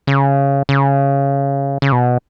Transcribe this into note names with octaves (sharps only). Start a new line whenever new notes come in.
C#3
C#3
C#3
B2